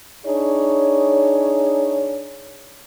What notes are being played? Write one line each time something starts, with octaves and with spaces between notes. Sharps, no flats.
D4 D#4 G#4 C#5